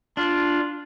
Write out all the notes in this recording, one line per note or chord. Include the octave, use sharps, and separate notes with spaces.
D4 F4